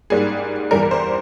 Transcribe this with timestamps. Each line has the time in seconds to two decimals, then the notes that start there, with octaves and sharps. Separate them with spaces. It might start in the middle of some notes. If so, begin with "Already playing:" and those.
0.10 G#2 G3 A#3 G#4
0.71 E2 E3 G3 A#4
0.83 A#4
0.91 C5